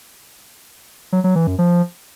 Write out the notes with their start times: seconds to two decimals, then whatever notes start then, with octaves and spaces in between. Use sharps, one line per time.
1.12 F#3
1.24 F#3
1.35 E3
1.47 F#2
1.58 F3